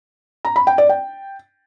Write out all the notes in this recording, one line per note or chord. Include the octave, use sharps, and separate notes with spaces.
A#5
B5
G5
D5
G5